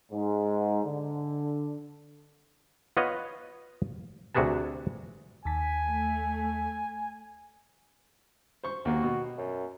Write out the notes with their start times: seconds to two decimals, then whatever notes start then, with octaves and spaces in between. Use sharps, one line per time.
0.11 G#2
0.85 D3
2.97 B3 F4 B4 C#5 D#5
4.35 D2 C3 F#4 G#4 B4 A5
5.45 D#2 G#5 A5 B6
5.90 A3
8.64 C5 C#6
8.85 D#2 A#3 F#4
9.03 B2
9.38 F#2